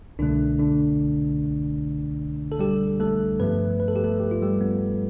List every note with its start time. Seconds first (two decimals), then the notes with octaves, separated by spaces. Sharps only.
0.19 C2 B2 D3 A3 D4
0.59 D3 D4
2.52 A4
2.59 G3 G4
3.00 A3 A4
3.40 G2 F3 A3 B3 B4
3.80 B4
3.88 A4
3.96 G4
4.04 A3 A4
4.20 G4
4.31 F4
4.42 G3 G4
4.61 B3